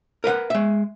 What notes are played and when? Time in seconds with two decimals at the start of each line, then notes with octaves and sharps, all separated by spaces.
0.24 A#4 B4 F5 F#5
0.50 G#3 E5